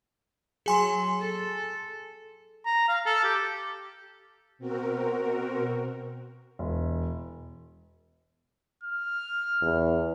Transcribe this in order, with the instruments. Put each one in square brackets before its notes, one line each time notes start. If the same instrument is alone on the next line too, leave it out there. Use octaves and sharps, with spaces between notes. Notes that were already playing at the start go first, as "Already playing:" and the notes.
[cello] F#3 [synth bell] G#4 G#5 C6
[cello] A4
[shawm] A#5
F5
A4
G4
[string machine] B2 C4 F#4 A#4
[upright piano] E1
[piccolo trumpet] F6
[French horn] E2